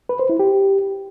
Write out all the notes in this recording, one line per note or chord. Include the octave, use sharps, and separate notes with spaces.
B4
C5
E4
G4